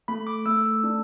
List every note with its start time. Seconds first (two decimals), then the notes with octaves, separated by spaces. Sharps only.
0.08 A3 B5
0.27 D6
0.46 A3 E6
0.84 D4